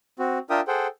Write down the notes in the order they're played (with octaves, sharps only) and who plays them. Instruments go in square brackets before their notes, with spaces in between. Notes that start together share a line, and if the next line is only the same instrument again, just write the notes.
[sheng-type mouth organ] C4 F#4
D4 F4 A#4 E5 G5 D#6
G#4 A4 C5 F#5 G5